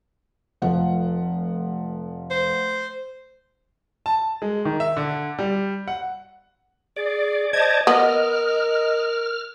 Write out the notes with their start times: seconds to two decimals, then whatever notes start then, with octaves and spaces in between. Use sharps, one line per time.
0.62 F1 F3 F#5
2.31 C5
4.06 A5
4.42 G#3
4.65 D#3
4.80 E5
4.97 D3
5.39 G3
5.88 F#5
6.96 G#4 D5
7.53 C5 D5 D#5 A5 G#6
7.87 B3 A#4 D#5 F6